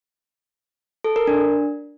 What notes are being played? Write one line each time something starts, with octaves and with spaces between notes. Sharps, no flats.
A4
A#4
D4